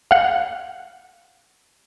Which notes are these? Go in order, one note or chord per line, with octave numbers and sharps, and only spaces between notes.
F5 F#5